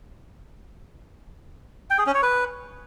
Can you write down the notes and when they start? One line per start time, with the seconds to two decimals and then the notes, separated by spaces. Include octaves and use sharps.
1.90 G5
1.98 G#4
2.06 C#4
2.14 C#5
2.23 B4